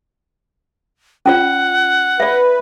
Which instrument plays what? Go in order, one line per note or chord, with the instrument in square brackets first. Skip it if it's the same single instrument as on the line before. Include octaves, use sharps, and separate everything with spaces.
[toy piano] C#4 F4 D5 [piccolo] F#5
[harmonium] B4 [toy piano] D5 E5